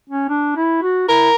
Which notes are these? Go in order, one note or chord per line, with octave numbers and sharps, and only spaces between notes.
C#4
D4
E4
F#4
E4 A#4